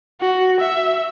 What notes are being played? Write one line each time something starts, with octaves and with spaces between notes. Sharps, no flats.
F#4
E5